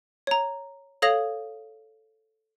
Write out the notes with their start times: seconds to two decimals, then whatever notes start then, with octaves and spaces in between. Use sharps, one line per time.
0.27 C#5 A#5
1.02 A4 C#5 F5 D#6 A#6 F7